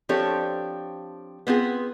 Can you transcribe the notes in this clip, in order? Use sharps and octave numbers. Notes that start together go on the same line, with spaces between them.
F3 C4 D4 G4 A4 C#5
B3 C4 F4 G#4